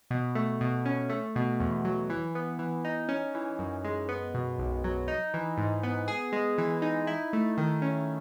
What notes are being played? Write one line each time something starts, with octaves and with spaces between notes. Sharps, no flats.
B2
A3
B2
C#4
A3
B2
E2
F#3
E3
B3
E3
D#4
C#4
E3
F#2
G#3
B3
B2
B1
F#3
D#4
E3
G#2
B3
G#4
G#3
E3
D#4
E4
A3
D#3
C#4